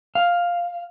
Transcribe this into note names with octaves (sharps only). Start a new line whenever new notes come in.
F5